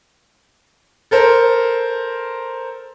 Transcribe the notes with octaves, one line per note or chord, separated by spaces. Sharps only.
A4 A#4 C5